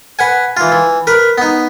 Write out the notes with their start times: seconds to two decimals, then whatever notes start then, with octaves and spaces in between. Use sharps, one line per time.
0.19 B4 F#5 G#5
0.57 E3 F4
0.72 E3
1.07 A#4 B4
1.38 B3 D#4